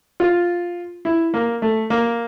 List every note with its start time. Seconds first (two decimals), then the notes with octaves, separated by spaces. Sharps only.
0.20 F4
1.05 E4
1.34 A#3
1.62 A3
1.90 A#3